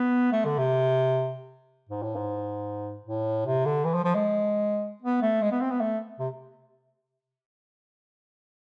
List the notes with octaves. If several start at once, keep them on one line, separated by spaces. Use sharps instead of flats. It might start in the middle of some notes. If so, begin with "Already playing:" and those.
Already playing: B3
A3
D3
C3
G#2
A2
G#2
A2
C3
D3
E3
F3
F3
G#3
B3
A3
G#3
B3
C4
B3
A3
C3